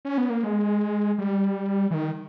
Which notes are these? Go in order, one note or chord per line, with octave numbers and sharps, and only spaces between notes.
C#4
B3
A#3
G#3
G3
E3
D#3